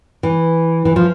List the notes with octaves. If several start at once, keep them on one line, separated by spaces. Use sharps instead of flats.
E3
E3
F3